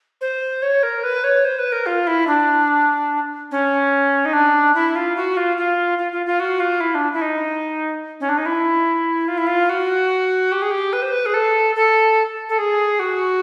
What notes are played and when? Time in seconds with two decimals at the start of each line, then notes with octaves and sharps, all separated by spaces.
0.21 C5
0.62 C#5
0.83 A#4
1.03 B4
1.24 C#5
1.45 C5
1.59 B4
1.72 A#4
1.86 F4
2.07 E4
2.27 D4
3.51 C#4
4.25 D#4
4.33 D4
4.74 E4
4.95 F4
5.16 F#4
5.37 F4
5.57 F4
5.98 F4
6.12 F4
6.26 F4
6.40 F#4
6.60 F4
6.80 E4
6.95 D4
7.13 E4
7.21 D#4
8.20 C#4
8.29 D4
8.37 D#4
8.46 E4
9.28 F4
9.38 E4
9.47 F4
9.69 F#4
10.52 G4
10.62 G#4
10.71 G4
10.93 B4
11.02 C5
11.12 B4
11.26 G#4
11.34 A4
11.75 A4
12.49 A4
12.58 G#4
12.99 F#4